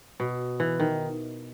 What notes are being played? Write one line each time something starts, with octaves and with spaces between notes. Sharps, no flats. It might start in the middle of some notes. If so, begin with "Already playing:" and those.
B2
E3
D#3